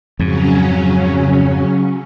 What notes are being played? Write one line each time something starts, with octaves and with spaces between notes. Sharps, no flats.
F2 G#2 C#3 F#3 C#4